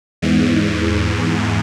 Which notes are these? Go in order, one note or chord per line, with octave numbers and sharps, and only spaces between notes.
E2 G#2